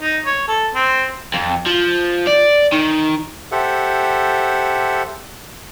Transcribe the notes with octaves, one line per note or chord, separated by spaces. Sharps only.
D#4
C#5
A4
C4
F2
F3
D5
D#3
G4 A4 C5 E5 F#5